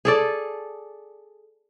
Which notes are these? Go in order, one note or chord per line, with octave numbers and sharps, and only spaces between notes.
G#4 A4 D5